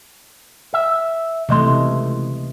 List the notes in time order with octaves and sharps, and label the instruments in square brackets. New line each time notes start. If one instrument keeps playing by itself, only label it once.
[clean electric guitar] E5
[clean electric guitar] C#2 D#5 C6 [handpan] C3 E3 A3